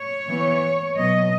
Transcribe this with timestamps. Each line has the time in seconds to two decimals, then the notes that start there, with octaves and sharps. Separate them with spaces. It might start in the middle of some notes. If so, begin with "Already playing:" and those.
Already playing: C#5
0.28 E3 B3
0.97 B2 F#3 B3 D#5